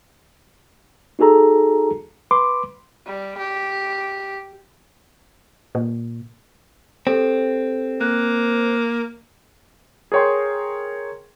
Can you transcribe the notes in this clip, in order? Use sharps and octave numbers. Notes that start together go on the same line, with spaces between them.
D#4 F#4 G#4 A4 A#5
B4 B5 C6 D6
G3
G4
A#2
C4 G4 A4
A#3 F#6
G#4 A#4 C#5 G5 C6